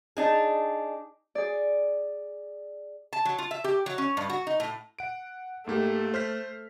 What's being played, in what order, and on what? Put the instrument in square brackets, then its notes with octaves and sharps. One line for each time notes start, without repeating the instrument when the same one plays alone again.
[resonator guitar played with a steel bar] D4 D#4 G#4
[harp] G#4 D5
[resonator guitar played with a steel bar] A5
F#3
F4
E5
G4
F#3
C#4
G2
F#4
D#4
A2
[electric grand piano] F#5 D7
[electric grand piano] G#2 A#3 G4 [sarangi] A3
[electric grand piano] C5 F6 B6